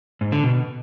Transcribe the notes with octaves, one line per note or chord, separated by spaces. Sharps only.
G#2
D3
B2